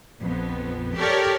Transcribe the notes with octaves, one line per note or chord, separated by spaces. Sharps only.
A#1 F2 B3
G4 A4 A#4 C#5 D5